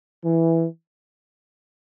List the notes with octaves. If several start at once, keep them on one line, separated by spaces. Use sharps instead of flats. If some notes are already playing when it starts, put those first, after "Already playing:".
E3